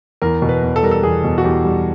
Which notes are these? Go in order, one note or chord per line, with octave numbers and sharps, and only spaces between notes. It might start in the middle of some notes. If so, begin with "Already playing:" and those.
E2 A#4
B2
B4
E2
A4
G3 A#4
A4
E2 G#4
B2
F#4
E2 G4
G3